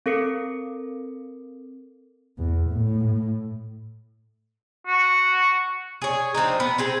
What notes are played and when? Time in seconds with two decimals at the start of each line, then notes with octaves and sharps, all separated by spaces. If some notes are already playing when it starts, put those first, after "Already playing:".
0.06 C4 A4 A#4 C#7
2.38 E2
2.69 A2
4.87 F#4
6.02 G#4 C#5
6.34 F3 C4 D4 D#4
6.60 B3
6.78 C4 G#4 G5